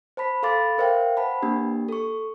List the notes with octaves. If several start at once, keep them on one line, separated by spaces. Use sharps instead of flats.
C5 A5 B5 B6
A4 F5 B5 C6 D6 A6
A#4 C5 E5 F5 G5
B4 C5 F#5 A5 B5
A#3 D4 G4
A4 C#6